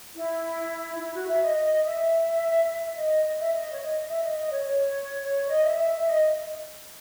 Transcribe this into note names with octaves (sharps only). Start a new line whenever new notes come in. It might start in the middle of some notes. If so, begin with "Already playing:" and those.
E4
E4
F#4
E5
D#5
D#5
E5
E5
D#5
D#5
E5
D#5
C#5
D#5
D#5
E5
D#5
D#5
C#5
C#5
C#5
D#5
E5
E5
D#5